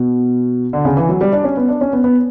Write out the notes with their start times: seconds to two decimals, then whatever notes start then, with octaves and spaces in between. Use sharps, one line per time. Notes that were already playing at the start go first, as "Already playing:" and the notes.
Already playing: B2
0.73 D3
0.85 C#3
0.97 E3
1.09 F#3
1.21 G3
1.33 D4
1.44 C#4
1.57 B3
1.69 D4
1.81 C#4
1.93 B3
2.04 B3